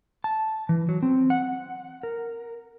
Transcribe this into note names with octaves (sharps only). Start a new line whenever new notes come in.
A5
E3
F#3
C4
F#5
A#4